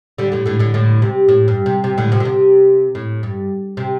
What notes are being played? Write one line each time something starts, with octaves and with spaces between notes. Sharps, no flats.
D3 G3
A2 D3
A2 D3
A2 D3
A2 D3
C3
A2
G2
C3
C3
A2 D3
C3 F3
D3
C3
A2
G2
C3